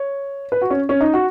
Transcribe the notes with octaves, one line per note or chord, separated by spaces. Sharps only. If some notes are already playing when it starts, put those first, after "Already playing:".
Already playing: C#5
B4
F#4
C#4
C#4
D#4
F#4